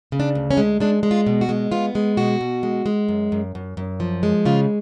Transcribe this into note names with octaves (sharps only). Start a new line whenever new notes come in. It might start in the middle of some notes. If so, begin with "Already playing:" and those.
C#3
D4
D2
C#4
G#3
G#3 D4
G#3
F4
B2
F#4
G#3
B3 F4
G#3
B2 F#4
B2
G#3
G#3
F#2
F#2
F#2
F#2
F3
G#3
C#3 F4